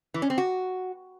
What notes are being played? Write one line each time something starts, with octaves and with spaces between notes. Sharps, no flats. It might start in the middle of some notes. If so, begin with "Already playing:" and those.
E3
C#4
C4
F#4